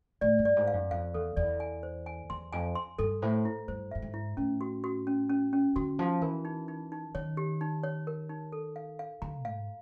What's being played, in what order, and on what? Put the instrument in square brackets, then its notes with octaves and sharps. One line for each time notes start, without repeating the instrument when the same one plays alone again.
[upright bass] A2 [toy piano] D5
[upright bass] G2
[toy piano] D5
[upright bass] G#2
[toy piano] F5
[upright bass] F#2
[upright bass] F2 [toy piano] F5
[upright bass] E2 [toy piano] A4
[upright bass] E2 [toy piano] D5
[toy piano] G#5
C5
G#5
[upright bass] E2 [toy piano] C6
[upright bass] F2 [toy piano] G#5
[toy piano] C6
[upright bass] G2 [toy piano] A4
[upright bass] A2 [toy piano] C5
[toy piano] E4
[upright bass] G2 [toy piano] C5
[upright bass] G2 [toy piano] E5
[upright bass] G#2
[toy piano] E4
[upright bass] A2 [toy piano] C#4
[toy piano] F#4
F#4
C#4
C#4
C#4
[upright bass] D3 [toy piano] F#4
[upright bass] F3 [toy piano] D#4
[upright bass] E3 [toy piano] A#4
[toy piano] D#4
D#4
D#4
[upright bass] D#3 [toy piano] C#5
[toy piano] G4
D#4
C#5
A#4
D#4
A4
F5
F5
[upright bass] D3 [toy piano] A#5
[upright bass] G#2 [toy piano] F5